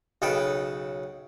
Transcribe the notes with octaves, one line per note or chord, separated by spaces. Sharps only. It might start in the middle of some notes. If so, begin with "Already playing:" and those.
B1 C#3 A4 B4 G5 A5